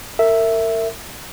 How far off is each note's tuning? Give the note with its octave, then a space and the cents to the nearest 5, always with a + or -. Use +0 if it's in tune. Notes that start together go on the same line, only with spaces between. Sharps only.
A#4 -35 E5 +0